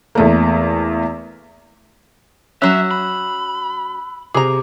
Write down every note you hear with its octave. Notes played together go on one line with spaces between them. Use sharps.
E2 A3 A#3
F#3 C#4 E5 E6 F#6
B5
C3 G#4 A#5 D6